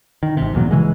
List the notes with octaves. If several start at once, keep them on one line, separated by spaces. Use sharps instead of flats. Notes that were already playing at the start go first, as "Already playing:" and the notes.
D#3
G#1 C3
A#1 E2 A#2 F#3
C#3 E3 G#3